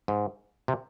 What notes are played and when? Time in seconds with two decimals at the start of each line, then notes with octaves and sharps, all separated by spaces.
0.08 G#2
0.68 C3